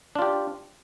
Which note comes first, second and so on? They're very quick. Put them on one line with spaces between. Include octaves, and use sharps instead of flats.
D4 F4 G4